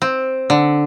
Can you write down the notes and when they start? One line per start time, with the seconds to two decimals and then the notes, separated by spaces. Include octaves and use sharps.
0.02 C4
0.50 D3